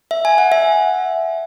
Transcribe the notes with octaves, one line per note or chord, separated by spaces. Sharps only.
E5
G#5
F#5
E5